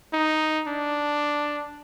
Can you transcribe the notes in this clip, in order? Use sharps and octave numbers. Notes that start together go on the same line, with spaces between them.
D#4
D4